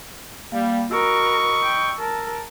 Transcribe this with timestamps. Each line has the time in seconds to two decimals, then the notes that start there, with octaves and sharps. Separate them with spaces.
0.52 G3 A#3 F5
0.91 F#4 A#4 D#5 B5 C#6 E6
1.63 G5
1.98 A#4 A5